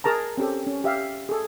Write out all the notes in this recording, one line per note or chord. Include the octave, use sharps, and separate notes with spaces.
G#4 A#4 A5 A#5
C4 C#4 G4 A4
C#4
G4 E5 F5
G#4 A4